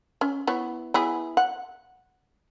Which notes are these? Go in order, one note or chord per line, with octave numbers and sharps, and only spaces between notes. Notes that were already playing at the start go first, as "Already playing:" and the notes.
C#4
B3 E4 C#5
B3 E4 G#4
F#5